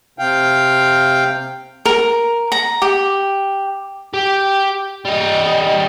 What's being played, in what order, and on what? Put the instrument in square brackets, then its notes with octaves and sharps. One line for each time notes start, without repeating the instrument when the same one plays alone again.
[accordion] C3 F5 G5
[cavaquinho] A#4
A#5
G4
[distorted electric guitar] G4
G3 D#5